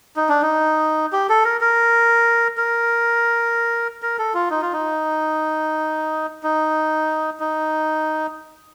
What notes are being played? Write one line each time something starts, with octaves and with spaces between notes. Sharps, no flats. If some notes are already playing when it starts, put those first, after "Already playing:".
D#4
D4
D#4
G4
A4
A#4
A#4
A#4
A#4
A4
F4
D#4
F4
D#4
D#4
D#4